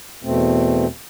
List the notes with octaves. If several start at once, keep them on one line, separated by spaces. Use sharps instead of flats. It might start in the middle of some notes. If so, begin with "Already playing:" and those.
E2 B2 A3 C4